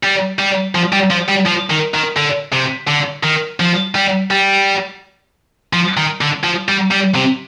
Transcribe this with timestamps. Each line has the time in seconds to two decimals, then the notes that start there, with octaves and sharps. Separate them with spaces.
0.03 G3
0.39 G3
0.75 F3
0.93 G3
1.10 F3
1.28 G3
1.46 F3
1.70 D#3
1.94 D#3
2.16 D3
2.52 C3
2.88 D3
3.23 D#3
3.60 F3
3.95 G3
4.31 G3
5.73 F3
5.97 D#3
6.21 D3
6.44 F3
6.69 G3
6.91 G3
7.15 C3